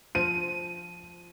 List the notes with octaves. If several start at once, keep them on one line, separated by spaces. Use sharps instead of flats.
F3 D#7